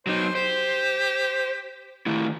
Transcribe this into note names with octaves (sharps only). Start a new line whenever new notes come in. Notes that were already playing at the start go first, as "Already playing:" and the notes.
F#3 D#4 C5
G4 C5
D#3 A3 E4